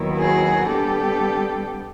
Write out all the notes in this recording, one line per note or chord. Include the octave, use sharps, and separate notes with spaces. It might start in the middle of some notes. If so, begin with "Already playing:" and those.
Already playing: D#2 D#3 F#3 B3 E4
F#4 G#4
D3 G3 B3 G4 A4